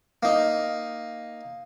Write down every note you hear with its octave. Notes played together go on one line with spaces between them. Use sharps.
A#3 D#4